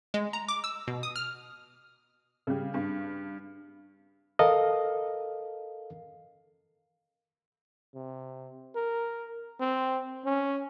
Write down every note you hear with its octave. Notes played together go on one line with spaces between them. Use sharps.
G#3
A#5
D6
E6
B2
D#6
F6
C#3 G3
G2
A4 A#4 D#5 F5
C3
A#4
C4
C#4